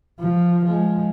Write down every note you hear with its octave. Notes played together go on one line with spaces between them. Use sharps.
F3
F3 G#3